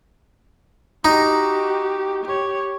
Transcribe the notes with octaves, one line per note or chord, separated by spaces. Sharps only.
D#4 F#4 G4
G4 C#5